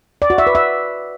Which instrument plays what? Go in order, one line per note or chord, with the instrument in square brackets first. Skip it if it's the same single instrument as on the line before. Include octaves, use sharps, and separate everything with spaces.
[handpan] D5
F#4
E5
B4
E5